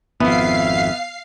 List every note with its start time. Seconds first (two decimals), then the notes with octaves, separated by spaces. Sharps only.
0.20 G#1 F2 B3 E5 F5 C7